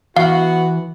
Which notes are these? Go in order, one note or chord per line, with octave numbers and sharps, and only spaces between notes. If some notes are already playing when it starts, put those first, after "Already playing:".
E3 B3 F#4 F5